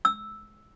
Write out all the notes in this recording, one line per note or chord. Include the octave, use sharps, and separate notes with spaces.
E6